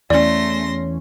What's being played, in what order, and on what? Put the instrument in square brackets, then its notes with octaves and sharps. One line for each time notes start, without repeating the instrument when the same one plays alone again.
[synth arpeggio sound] E2 C#4 [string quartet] A3 C6 A#6 [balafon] D5